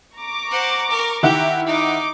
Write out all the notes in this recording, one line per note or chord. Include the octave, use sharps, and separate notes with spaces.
A#5 C#6 D6
C5 F#5
A#4
D#3 E4 G4 F#5
D#4 D6